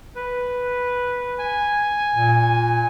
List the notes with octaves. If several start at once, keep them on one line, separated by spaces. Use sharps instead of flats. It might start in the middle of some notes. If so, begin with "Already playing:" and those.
B4
G#5
A#2